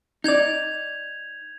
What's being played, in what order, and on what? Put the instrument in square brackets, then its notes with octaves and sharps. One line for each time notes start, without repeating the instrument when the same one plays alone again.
[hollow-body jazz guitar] D#4 D5 [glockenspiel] G6 G#6 F7